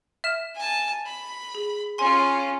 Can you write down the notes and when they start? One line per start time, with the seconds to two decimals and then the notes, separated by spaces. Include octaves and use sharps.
0.24 E5 F6 E7
0.55 G#5 A5
1.05 B5
1.55 G#4
1.98 C#4 F4 G#5 C6